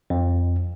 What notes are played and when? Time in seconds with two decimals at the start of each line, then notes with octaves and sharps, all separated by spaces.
0.10 F2